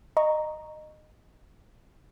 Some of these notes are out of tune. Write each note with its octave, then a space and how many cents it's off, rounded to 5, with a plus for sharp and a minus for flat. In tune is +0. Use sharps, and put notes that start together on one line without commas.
D#5 -20 A#5 +0 C#6 +0